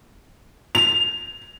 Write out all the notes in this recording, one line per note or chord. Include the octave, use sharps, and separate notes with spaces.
F7